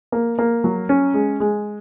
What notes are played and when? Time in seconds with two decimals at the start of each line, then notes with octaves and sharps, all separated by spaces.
0.12 A#3
0.39 A#3
0.64 F#3
0.89 C#4
1.14 G#3
1.40 G#3